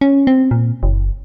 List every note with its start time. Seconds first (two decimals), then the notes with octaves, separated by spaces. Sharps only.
0.01 C#4
0.27 C4
0.51 A#2
0.83 F#1